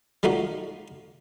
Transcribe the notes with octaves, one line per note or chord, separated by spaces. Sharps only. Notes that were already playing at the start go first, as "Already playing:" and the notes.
G3 A3 D#4 F4 F#4